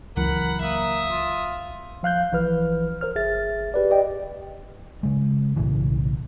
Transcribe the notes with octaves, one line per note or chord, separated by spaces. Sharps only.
C#2 E3 F#3 A#4 F#5 B5
A#3 E5 D#6
F4
F3 F5 F#6 G6
A#1 E3 F3 B4 F6
A#4 C5 F6
G1 G#4 E5 A6
G4 B4 D5
G4 D5 D#5 G5
C#3 G#3
B1 A2 C#3 E3